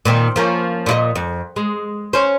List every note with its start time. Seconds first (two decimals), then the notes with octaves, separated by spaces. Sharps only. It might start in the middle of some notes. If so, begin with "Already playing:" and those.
0.05 A#2 D#3 C4
0.36 F3 A#3 C#4
0.86 A#2 E4 D#5
1.16 F2
1.56 G#3
2.13 C#4 C5